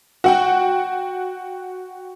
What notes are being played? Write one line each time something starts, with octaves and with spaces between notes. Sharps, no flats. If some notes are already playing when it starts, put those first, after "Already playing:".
F#4 F#5 G5